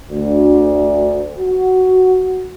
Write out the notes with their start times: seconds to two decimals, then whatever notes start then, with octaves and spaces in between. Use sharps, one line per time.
0.10 D2
1.40 F#4